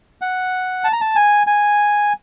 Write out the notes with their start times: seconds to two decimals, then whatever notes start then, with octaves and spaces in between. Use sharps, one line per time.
0.22 F#5
0.84 A5
0.93 A#5
1.01 A5
1.16 G#5
1.47 G#5